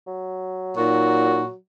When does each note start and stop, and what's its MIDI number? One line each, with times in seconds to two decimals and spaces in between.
0.07 1.57 54
0.77 1.48 46
0.77 1.42 63
0.77 1.53 66